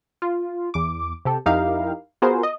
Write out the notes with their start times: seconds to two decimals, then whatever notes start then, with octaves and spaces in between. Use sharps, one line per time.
0.22 F4
0.74 E2 D6
1.25 C3 G4 A4
1.46 F2 D#4 E4 G4 A#4 F5
2.22 B3 F4 F#4 G#4 A#4 C5
2.43 D#5